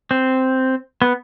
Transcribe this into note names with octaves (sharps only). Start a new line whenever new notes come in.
C4
B3